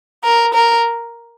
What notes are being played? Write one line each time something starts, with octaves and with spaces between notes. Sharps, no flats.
A#4
A#4